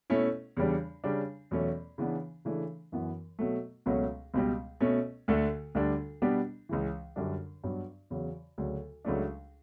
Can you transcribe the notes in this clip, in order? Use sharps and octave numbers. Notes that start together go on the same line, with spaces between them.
B2 A3 C#4 E4
E2 C#3 G3 D4
C#3 G3 D4
E2 B2 F#3 A3 C#4
C#3 E3 B3 D4
C#3 E3 A3 D4
F#2 E3 B3
B2 F#3 A3
C#2 B2 F#3 A3 C#4
C#2 B2 G3
B2 A3 C#4
D2 D3 A3
D2 D3 G3 D4
B2 G3 B3 D4
C#2 C#3 E3
F#2 D3 G3 D4
G2 F#3 B3 D4
E2 C#3 F#3
D2 C#3 F#3
C#2 C#3 F#3 A3 D4